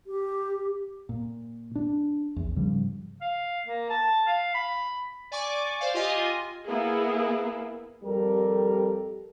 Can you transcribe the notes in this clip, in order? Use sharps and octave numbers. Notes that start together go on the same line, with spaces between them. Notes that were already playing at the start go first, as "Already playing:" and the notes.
G4
A#2
D4
A#1 E2
G#2 C#3 F3 G3
F5
A#3
A5
F5
B5
D5 G#5 C#6 D6
C5 D5 F5
F4 G4 D#5 G#5
A#3 B3 E4 G#4 A#4
F2 G3 G4 A4 A#4